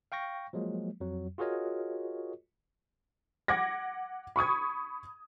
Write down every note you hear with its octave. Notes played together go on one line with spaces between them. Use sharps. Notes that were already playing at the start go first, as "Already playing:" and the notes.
F5 G5 C#6 A#6
F3 F#3 G#3 A#3
F2 F#3
F4 F#4 G#4 A#4 C#5 D#5
F#5 D6 G#6 A#6
B5 C#6 D#6 G#6